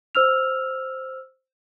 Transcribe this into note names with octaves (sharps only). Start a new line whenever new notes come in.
C5 E6 F6 F7